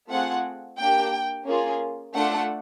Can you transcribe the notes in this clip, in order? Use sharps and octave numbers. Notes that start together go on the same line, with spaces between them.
A3 C4 F4 G#4 F#5
A#3 D4 G4 G5
A#3 C#4 F4 G#4
A3 D4 F4 A4 F#5